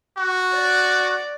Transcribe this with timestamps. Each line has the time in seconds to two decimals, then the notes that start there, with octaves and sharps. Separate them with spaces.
0.18 F#4
0.53 D5